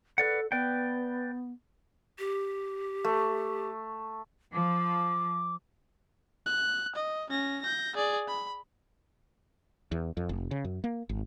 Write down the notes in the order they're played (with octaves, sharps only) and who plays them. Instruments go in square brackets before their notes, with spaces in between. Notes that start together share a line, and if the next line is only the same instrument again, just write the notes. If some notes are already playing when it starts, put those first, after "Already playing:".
[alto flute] A4 [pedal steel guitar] B4 D5 F#5
[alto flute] B3 [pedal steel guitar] B4 D5 G5
[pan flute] G4
[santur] A3
[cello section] F3 [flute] D6
[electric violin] F#6
D#5
C#4 A#6
G6 A#6
G#4 D5
B5
[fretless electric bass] E2
F2
F1
C#3
F#2
A#3
G#1